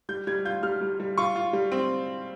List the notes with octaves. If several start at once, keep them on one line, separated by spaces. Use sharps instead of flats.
G3 G6
G3 G#6
F4 G6
G3 F6
G3
G3
F4 C#6
F4
G3
C4